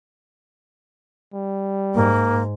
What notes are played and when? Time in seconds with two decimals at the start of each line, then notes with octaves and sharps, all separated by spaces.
1.33 G3
1.94 G#2 A#3